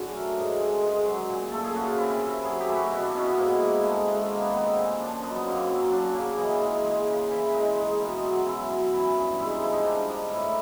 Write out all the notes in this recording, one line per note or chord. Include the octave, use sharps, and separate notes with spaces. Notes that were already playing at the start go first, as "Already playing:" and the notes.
Already playing: F#2 C#3 D4 F#4
A3 A#4
G#2
G#3
G#3
F#3
A#2
A3 A4
G#4
C#3 F#4
F4
C3 E4
C3
F#3 G#4
G4
A3
F#4
B2 E4
D4
B2 C#4
B3
G#2 A#3
G#2
G#3 A3
G#3
D#3 A#3
B3
D#3 B3
C4
A#2 C#4
F3 D4
F#2 D#4
B3
F#2 A#3
C4
F#3 C#4
F#3 D4
C#3 A#3
E3 D#4
G#3
G#3
C#3
E3
G#3 D#4
G#3
B2
F#3
F#2 E4
F#2
E3
G2
G#3 E4
D#4
F3 E4
D#4
G3 D4
G3 D#4
A2 E4